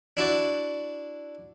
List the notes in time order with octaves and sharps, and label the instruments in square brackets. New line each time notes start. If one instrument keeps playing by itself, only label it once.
[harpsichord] D4 E4 F#4 D5